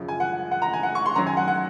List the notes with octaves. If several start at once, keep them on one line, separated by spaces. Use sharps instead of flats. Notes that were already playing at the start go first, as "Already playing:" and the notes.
Already playing: F#2 C#3 F3
G#5
F#5
F#5
A#5
G#5
F#5
C#6
C6
F#2 D#3 F#3 A#5
G#5
F#5
F#5